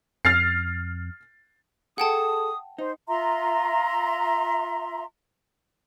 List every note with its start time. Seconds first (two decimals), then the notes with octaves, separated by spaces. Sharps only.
0.25 F2 F6 A6 C7
1.98 G#4 A4 F#5 G5 A5 D#6
2.78 D#4 C5
3.08 F4 E5 A#5 C6